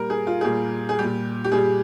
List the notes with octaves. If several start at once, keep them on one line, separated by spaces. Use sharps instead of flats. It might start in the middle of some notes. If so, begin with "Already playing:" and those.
Already playing: A#2 G3 A#4
G#4
F4
G#4
A#2 G3 G4
G#4
A#2 G3 G4
G4
A#2 G3 G#4